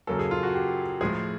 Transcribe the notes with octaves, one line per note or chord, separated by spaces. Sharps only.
F#2 C#3 F#3 A#3 A4
G#4
F4
F#4
G4
A2 F3 G#3 G#4